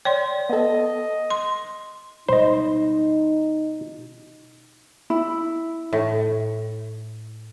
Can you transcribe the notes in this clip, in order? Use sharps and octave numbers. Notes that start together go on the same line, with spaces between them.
C#5 D5 G5 C6
B3 A4 D#5
C6
B2 G3 G#3 D#4 C5 D#5 B5
E4
A2